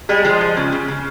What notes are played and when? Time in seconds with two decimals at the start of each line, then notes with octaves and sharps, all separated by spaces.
0.09 G3 G#3 G#4
0.24 F3 G#3 G#4
0.41 G#3
0.57 C#3
0.72 C#3
0.88 C#3